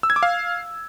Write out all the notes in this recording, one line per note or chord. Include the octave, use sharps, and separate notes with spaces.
E6
G#6
D6
F5